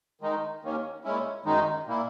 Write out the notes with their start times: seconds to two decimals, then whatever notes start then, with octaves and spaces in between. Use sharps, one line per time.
0.21 D#3 G#3 D#4
0.63 D#2 D#3 A#3 C#4
1.04 A#2 G#3 C#4 E4
1.45 F#2 D#3 G#3 D#4
1.87 A#2 A#3 E4